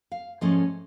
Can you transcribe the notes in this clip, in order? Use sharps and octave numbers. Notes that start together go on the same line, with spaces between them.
F5
G#2 F3 A3 C#4 D#5